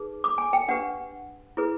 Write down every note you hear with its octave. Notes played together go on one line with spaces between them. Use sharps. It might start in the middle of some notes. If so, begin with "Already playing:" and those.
Already playing: D#4 G#4 B4
D6
G#5
G5
D4 G4 B4 F#5
E4 G#4 B4